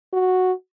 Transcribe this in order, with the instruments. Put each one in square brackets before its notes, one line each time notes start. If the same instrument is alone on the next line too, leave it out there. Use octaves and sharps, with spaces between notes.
[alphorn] F#4